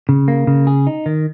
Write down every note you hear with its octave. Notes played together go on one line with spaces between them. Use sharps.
C#3
A#3
C#3
G#4
D#4
D#3